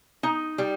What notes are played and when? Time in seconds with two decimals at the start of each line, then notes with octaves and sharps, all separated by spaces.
0.23 D#4
0.58 G3